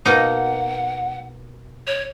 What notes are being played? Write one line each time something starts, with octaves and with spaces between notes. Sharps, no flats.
B2 A#3 D#4 F#5
C#5